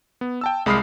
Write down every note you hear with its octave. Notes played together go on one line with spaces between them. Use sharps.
B3
G5 A5 E6
C2 G#3 B5 D#6 F6 C7